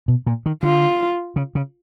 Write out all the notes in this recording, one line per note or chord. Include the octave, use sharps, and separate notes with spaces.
B2
A#2
D#3
D3 F4
C#3
C#3